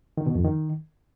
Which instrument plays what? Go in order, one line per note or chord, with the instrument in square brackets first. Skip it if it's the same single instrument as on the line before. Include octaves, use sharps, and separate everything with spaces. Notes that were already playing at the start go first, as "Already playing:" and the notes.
[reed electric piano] D#3
B2
F2
D#3